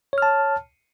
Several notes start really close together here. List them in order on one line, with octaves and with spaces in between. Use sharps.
C#5 F6 A5